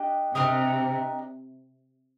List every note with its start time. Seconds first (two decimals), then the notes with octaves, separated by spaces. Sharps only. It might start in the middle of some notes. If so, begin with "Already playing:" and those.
Already playing: D4 G4 D#5
0.35 C3 D4 G4 A#4 D#5